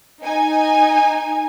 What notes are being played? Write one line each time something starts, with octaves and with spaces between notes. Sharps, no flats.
D#4 G#5